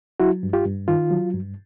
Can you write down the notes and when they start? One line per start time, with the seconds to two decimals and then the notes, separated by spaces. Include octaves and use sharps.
0.20 F#3 E4 F#4
0.43 G2
0.53 F4 G4
0.66 G2
0.88 D#3 F4
1.11 F#3
1.34 G2